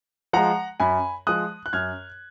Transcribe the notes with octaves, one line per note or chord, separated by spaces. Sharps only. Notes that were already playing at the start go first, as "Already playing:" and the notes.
F3 G#3 F#5 A#5
F#2 G#5 B5
F3 G#3 D#6 F#6
F#6
F#2 F6 G#6